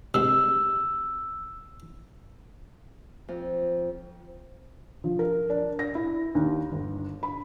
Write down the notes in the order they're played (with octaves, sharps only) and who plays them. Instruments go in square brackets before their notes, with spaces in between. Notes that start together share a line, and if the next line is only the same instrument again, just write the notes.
[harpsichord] C2 G#2 C3 [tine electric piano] E6
[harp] F2
[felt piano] F3
A#4
D4
A#6
E4
D#2
G1
B5